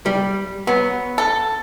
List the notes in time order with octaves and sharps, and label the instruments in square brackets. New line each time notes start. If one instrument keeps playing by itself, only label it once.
[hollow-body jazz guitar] G3
[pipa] F#3 [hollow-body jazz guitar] B3
[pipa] A4